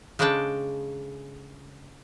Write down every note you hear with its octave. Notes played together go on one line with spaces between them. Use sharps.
C#3 G#3 D4 A4 G5 A5